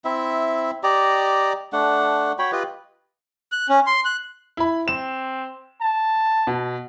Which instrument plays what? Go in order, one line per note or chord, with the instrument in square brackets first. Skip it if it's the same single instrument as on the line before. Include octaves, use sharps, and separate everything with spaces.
[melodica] C4 E4 E5
G4 D5 D#5 A#5
A3 D4 F#5
F#4 C#5 G5 B5
F4 G4 B4 D#5
[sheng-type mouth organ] F#6
C#4
C6
F#6
[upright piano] E4 B5
[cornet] C4 [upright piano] E7
[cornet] A5
[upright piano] B2